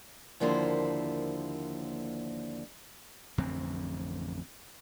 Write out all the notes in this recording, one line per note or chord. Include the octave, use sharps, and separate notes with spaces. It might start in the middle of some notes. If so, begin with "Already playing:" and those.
D#2 D3 F3 A#3 E4 C5
A1 F2 D3 C4